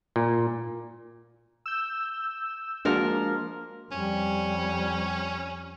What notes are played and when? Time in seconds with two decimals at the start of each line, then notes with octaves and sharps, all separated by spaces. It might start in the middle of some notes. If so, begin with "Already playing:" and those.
0.16 A#2
1.66 E6 G6
2.85 F3 G#3 A#3 D4 F#4 A#4
3.92 F2 G3 C#4